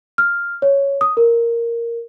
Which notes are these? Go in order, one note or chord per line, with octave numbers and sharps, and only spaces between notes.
F6
C#5
D#6
A#4